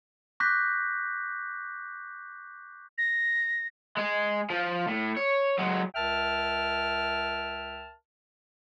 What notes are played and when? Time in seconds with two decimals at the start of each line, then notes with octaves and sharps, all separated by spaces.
0.40 C#6 D6 F#6 G6 A#6 B6
2.98 A#6
3.97 G#3 G#4
4.50 F3
4.88 A2
5.17 C#5
5.59 F#3 G#3
5.95 C#2 A#4 E5 G5 A5 F6